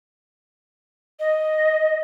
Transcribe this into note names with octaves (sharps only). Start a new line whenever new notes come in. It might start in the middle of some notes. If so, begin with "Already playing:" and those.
D#5